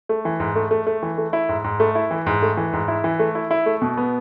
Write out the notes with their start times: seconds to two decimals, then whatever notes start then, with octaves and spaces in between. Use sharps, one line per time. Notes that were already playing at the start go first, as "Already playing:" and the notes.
0.09 A3
0.25 E3
0.40 G#2
0.56 A3
0.71 A3
0.87 A3
1.03 E3
1.18 A3
1.33 E4
1.49 G#2
1.64 G#2
1.80 A3
1.95 E4
2.11 E3
2.26 G#2
2.42 A3
2.57 E3
2.73 G#2
2.88 E4
3.04 E3
3.20 A3
3.35 E4
3.51 E4
3.66 A3
3.82 B2
3.97 B3